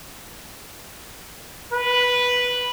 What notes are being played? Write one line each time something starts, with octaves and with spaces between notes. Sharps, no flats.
B4